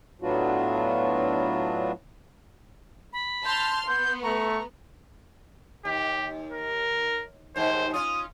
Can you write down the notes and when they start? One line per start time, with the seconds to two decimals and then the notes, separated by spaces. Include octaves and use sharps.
0.22 A2 F#3 B3 D4 F4 F#4
3.13 B5
3.45 A5 C6 F6 G6
3.87 B3 C6 G6
4.23 A3 A#5 C#6
5.85 D#2 G4
6.51 A#4
7.56 D#2 G#2 C5
7.94 C#4 F4 D#6